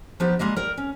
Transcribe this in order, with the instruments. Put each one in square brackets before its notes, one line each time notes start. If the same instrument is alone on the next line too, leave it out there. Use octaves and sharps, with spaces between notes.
[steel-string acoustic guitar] F3 B3 D4 D#4 G4
G3 G#3 A#3 D#5
A#4 D5 G5
C#4